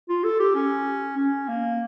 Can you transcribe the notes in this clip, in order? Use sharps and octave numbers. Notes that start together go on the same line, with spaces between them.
F4
A4
G4
C#4
C#4
A#3